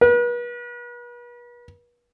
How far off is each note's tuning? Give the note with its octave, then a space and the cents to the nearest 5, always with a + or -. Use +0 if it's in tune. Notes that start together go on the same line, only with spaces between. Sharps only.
B4 -40